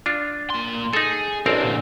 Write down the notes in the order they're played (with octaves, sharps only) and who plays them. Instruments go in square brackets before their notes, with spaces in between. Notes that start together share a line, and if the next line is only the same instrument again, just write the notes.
[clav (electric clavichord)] D4 F4
[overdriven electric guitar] A#2 C6
[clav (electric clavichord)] D#4 A4 [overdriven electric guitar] G#4
[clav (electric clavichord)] A1 C4 A#4 [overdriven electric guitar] D4 E4
[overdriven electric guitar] A#2 D3